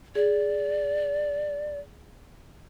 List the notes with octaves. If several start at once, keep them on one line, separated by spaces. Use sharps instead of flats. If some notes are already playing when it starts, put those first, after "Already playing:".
G#4 D5